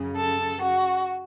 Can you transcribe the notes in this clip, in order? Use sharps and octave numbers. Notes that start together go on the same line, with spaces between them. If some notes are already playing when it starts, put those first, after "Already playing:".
Already playing: F#2 C#3
A4
F#4